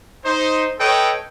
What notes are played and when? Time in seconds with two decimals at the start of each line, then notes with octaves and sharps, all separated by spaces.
0.25 D#4 C5
0.80 A4 B4 C#5 D#5 G5